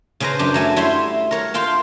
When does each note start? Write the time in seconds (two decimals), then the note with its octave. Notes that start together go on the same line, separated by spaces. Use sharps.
0.20 C#3 C#4 B4 C5 A#5
0.39 F#2 D4 G4
0.54 F#3 A3 G#5
0.76 G3 E4 C#5 E5 C6
1.31 A#4 C#5 F#5
1.54 F4 F5 G5 A5